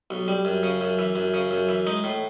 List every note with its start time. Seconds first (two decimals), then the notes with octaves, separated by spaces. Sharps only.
0.10 B1
0.28 G3
0.45 F#2
0.63 C#3
0.81 F#2
0.99 E3
1.16 F#2
1.34 C#3
1.51 F#2
1.69 E3
1.87 G#3 D#4
2.04 A2